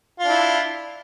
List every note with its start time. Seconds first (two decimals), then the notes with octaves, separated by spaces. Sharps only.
0.20 F4
0.24 D4
0.29 E4